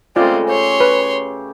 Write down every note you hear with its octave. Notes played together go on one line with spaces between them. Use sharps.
C#3 G#3 A3 C4 F4 C#5 D5
G4 C#5 C6
B4